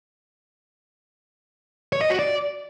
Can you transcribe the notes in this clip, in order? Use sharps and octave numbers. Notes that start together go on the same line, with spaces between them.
C#5
D#5
F#4
D5